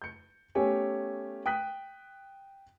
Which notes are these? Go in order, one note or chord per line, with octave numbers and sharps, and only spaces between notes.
G6 C#7
A3 B3 C#4 G4 C#5 G#5
G5 D#6 F#6 B6